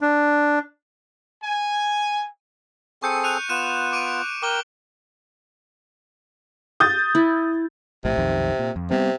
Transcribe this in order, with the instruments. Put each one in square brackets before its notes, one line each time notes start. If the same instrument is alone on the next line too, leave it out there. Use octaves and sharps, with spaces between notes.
[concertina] D4
[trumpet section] G#5
[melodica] C4 G#4 A4 [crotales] C#6 G6 C#7
[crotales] F#6 D#7 F7
[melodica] B3 F4 [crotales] F#6 D#7 E7
[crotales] D6 D7 D#7
[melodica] A#4 G5 [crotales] D6 G7
[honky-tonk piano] D#6 G6 A6
[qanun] E4
[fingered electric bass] A#1 A2 [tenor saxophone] C3
[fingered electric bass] B1 F2 D#3
A#2
F2
[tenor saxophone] C3 [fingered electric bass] G3 B3 C4